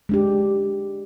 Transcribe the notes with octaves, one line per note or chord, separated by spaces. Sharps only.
G#3 D4 G4